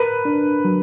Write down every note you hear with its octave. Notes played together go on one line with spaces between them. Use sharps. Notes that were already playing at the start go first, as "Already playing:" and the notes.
Already playing: A#4 B4
D4
F#3